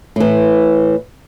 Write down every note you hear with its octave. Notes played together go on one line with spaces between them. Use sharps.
A2 E3